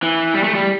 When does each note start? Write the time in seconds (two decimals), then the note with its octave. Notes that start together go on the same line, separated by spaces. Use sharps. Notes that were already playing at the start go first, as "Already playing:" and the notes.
0.03 E3
0.35 G3
0.44 A3
0.55 G3